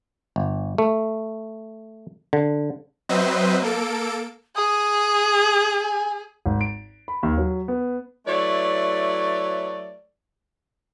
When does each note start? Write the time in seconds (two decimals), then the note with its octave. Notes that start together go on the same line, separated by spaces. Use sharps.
0.36 G1
0.78 A3
2.33 D3
3.09 F#3 C4 B4 C5 D#5 E5
3.62 A#3 A4 D7
4.56 G#4 D#6
5.82 G#5
6.46 G#1
6.61 D7
7.08 B5
7.23 D#2
7.38 F#3
7.68 B3
8.27 F#3 A3 E4 B4 C#5 D5